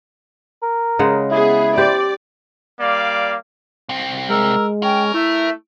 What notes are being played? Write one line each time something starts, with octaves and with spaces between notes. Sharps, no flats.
A#4
C#3 G#3 F#5
B3 E4 G#4
G4 C5 D5
G3 A#3 D5 F5 D6
C2 C4
G#3 A#4 E6
C#4 A#4 G5
A3 E4 E5